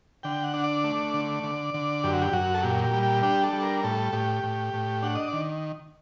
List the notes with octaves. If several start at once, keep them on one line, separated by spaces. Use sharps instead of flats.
D3 G5
F#5
D4
D5
A3
D3
D3
D3
F#2 G4
F#4
G4
F#2 F#4
A4
A#2 G4
G4
G3
G4
D4 G4
A4
G3
A#4
A2 A4
A2 G4
A2
A2
D4 F#5
D#5
D#3 D5